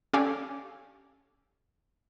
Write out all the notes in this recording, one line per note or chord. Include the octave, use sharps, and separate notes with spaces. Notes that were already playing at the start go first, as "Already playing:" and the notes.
C#4 G4 A4 D5 F5 G#5